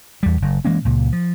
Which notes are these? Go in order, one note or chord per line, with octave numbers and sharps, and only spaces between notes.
E2 G3
F#1
E3 G#3 A#3 C#4
C#2 A#2
F3